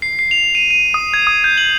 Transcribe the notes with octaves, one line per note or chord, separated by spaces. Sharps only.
C7
C7
F7
D#7
D#7
D#6
G#6
D#6
G6
F#7